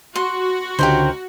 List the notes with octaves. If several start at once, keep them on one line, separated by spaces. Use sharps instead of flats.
F#4 C6
C#2 D3 G4 A#4 C5